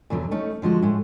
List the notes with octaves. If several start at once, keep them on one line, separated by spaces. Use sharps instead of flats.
E2 B2 D3 F#3
A3 C#4 D#4
D3 F3 G#3 F#4
A2 G#3